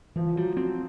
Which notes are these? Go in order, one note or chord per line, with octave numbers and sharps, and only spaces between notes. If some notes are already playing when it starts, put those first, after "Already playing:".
E3 F3
F#3 G3
F#3 C4